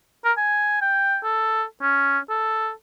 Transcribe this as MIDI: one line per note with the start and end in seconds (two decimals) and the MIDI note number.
0.25 0.32 70
0.37 0.77 80
0.81 1.18 79
1.24 1.64 69
1.82 2.19 61
2.30 2.71 69